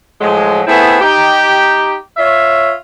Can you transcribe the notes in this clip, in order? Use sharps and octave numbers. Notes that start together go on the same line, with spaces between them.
A2 F3 F#3 G#3
A3 B3 C4 E4 G#4
D#4 G4
F4 C#5 E5